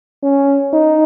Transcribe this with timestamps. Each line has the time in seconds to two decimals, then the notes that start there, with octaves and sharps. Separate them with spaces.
0.23 C#4
0.73 D#4